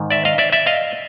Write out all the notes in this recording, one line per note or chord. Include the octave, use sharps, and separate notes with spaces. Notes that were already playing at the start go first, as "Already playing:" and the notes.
Already playing: G#2 D#3
D5 E5
D#5 F5
D5 E5
D5 E5
D#5 F5